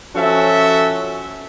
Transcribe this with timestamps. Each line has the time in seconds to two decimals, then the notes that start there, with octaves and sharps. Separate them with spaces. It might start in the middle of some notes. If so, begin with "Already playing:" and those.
0.14 F3 C#4 F#4 A4 E5